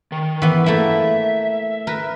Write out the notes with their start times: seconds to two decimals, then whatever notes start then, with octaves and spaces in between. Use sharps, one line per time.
0.12 D#3
0.42 E3 B3
0.66 A3 A#3 E4 E5
1.87 A#4 B4